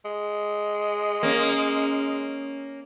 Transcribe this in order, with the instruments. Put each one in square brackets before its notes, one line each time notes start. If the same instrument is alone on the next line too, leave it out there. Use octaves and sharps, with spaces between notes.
[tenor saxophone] G#3
[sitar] A#3 C#4